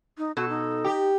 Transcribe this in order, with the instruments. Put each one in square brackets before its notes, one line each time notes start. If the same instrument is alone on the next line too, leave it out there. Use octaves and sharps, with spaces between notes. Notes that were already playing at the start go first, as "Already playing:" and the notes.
[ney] D#4
[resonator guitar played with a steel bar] B2 A4 [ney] F#4
[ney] D#4
[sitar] G4